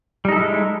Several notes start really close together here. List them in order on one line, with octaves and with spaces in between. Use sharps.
G3 D#4 A4 E4 G#3